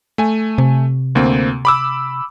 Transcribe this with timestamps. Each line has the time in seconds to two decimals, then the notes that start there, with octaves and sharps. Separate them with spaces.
0.18 A3 G#5
0.58 C3
1.15 D2 A#3 C4
1.65 B5 D6 E6